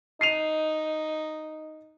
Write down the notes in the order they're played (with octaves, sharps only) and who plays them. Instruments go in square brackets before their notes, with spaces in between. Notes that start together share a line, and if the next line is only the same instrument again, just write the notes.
[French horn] D#4 [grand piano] C7 D#7 F7